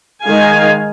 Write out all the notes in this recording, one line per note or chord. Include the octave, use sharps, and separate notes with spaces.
D#3 G#3 F5 G#5